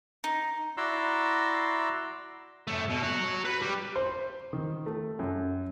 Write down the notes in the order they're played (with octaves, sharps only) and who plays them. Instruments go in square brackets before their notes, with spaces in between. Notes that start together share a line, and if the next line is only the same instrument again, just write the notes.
[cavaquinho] D#4
[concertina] E4 F#4 D5 A#5 C6 E6
[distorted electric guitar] F#2 A3
B2
F#4 C#5
B4 B5
G3
[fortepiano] C5
D#3
A3
F#2